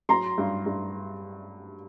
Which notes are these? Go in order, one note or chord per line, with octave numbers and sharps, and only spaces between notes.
F#3 A#5 C6
G2
G2